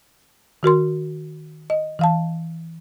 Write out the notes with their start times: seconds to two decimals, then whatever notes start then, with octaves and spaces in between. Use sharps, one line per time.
0.63 D#3 F#4 A#4 C6
1.70 D#5
1.99 E3 F5 A5